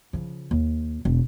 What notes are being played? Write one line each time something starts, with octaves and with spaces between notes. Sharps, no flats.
C#3 F3
D#2
E1